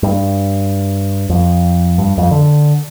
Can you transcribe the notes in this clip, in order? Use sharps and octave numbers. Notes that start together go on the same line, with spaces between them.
G2
F2
G2
F2
D3